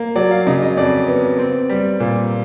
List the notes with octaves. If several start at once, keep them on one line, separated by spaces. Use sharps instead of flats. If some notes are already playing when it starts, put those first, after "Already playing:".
Already playing: A#3
F#3 D5
F5
C#3 D#5
D#5
F2 D5
B3
C4
G3
A#2